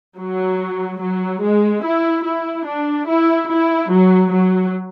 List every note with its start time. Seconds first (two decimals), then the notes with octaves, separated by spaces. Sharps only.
0.19 F#3
1.01 F#3
1.42 G#3
1.84 E4
2.25 E4
2.67 D4
3.08 E4
3.49 E4
3.91 F#3
4.32 F#3